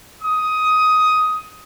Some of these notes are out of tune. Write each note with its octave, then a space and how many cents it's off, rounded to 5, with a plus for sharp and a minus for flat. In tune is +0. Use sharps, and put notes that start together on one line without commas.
D#6 +10